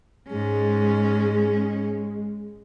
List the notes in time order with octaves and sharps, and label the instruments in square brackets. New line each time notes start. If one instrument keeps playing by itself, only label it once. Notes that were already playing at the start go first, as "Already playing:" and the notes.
[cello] G#2 C#4 [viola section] G#3